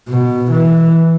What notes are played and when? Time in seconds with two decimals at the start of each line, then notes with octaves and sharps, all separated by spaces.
0.09 B2
0.51 E3